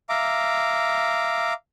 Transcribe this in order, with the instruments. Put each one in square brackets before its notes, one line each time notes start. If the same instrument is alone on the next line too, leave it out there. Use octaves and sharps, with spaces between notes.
[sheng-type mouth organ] E5 F5 A#5 D6